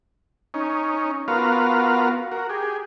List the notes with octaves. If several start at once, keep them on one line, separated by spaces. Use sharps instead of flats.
C#4 D#4
B3 F4 F#4 A#4 F5
F#4 A#4
G4 G#4